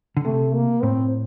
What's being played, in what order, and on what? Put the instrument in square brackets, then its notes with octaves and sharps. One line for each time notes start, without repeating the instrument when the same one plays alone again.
[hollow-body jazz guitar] D3
[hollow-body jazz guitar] C3 [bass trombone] A3
[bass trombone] A#3
[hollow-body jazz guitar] A2 [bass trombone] C4